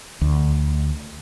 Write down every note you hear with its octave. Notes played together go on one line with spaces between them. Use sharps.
D2